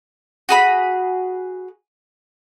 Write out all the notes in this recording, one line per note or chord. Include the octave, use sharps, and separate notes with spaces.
F#4 G#4 B5